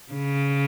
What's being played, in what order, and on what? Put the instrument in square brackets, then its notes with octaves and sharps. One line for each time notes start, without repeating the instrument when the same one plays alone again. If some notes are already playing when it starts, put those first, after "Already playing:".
[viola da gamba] C#3